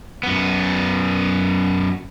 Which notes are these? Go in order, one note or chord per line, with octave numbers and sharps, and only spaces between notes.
F#2 B3